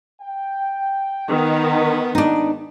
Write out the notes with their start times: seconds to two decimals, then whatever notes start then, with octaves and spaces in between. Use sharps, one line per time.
0.21 G5
1.29 D#3 B3
2.15 G#3 B3 D4 D#4